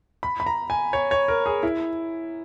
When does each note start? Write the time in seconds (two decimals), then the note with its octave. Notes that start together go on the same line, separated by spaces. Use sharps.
0.23 B5
0.40 B5
0.46 A#5
0.70 G#5
0.93 C#5
1.11 C#5
1.28 A#4
1.46 G#4
1.63 E4